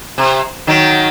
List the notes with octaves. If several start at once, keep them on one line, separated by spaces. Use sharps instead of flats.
C3
D#3 F#3